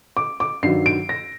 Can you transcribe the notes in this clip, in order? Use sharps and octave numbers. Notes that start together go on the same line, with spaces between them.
D6
D6
G2 D#3 F#3 C7
D7
A#6